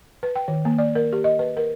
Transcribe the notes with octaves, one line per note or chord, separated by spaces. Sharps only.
B4
G5
D#3
A#3
D5
A#4
G4
D#5
B4
A#4